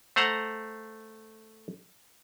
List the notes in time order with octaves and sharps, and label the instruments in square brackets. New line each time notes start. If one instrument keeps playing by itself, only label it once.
[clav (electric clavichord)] A3 C5 F#5 A#5